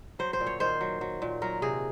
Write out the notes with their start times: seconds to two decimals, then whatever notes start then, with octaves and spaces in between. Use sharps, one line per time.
0.19 F#3 C5
0.33 C5
0.41 A#2
0.46 C#5
0.60 D#3 C5
0.81 F#3
1.01 F#3
1.22 A#2
1.42 F#3 A#4
1.62 C3 G#4